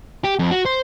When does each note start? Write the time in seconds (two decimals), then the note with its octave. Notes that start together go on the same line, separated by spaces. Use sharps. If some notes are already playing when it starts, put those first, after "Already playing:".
0.24 G4
0.39 F2
0.51 F#4
0.65 C5